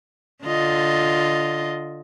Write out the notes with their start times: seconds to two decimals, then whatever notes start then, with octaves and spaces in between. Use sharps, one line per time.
0.44 D3 F4 D#5